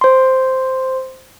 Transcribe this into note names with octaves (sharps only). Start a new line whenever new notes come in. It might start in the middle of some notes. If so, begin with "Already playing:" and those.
C5 C6